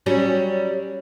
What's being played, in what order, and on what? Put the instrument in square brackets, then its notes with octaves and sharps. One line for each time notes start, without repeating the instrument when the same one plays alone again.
[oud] F#3 G3 C#4